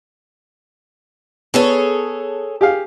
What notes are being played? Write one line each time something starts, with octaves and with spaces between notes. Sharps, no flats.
B3 G#4 A4 C#5
G4 G#4 F5